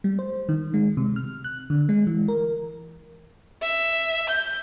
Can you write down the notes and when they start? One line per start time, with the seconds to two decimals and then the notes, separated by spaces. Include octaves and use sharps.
0.04 G3
0.19 C5
0.49 D#3
0.74 G#3
0.97 C3
1.16 F6
1.44 F#6
1.70 D3
1.89 G#3
2.07 E3
2.28 A#4
3.62 E5
4.29 G6